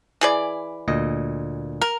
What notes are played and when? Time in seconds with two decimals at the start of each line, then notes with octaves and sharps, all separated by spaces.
0.21 E3 G#4 D5
0.88 D2 A#2 D#5
1.81 A#4